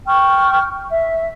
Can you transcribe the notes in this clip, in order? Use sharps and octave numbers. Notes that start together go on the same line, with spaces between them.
G5 C#6 F6
E5